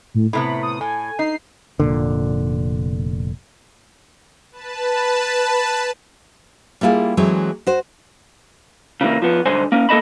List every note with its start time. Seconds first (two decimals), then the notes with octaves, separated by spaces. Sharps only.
0.15 A2
0.33 A2 C3 B3 B5
0.63 D#6
0.81 A2 G#5
1.19 D#4 C7
1.80 F1 A#2 D3
4.52 B4 A5
6.81 G3 A#3 E4 F4 G#4
7.17 E3 F#3 G#3 A3 C4
7.67 F#4 C5
9.01 C#3 E3 G#3 A#3
9.22 F3 B3
9.46 B1 G2 D3 C5 G#5
9.72 A#3 C#4
9.89 A#3 A4 C5 D#5 A5 B5